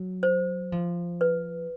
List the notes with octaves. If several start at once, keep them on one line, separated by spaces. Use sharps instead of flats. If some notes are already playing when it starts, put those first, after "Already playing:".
Already playing: F#3
C5
F3
B4